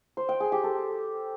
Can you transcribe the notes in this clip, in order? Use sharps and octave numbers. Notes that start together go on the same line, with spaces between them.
C5
G5
G#4
G4
A4